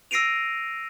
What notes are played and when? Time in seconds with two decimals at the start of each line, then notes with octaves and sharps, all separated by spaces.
0.11 E6 A#6 C7 D7 D#7 F7